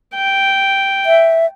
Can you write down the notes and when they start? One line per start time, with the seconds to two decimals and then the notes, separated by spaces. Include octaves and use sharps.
0.15 G5
1.06 E5